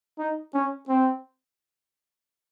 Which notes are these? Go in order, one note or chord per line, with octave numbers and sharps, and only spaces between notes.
D#4
C#4
C4